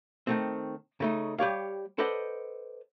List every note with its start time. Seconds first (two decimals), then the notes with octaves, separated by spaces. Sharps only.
0.27 D#3 A3 C4
1.00 C#3 A3 D#4
1.38 G3 G4 C#5 F5
1.98 A4 B4 C5 D5 D#5 F#5